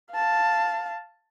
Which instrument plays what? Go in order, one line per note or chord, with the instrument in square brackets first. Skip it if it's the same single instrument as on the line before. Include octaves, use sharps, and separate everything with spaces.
[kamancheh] F5 A5